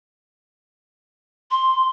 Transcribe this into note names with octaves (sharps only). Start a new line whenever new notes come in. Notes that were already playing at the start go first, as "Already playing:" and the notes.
C6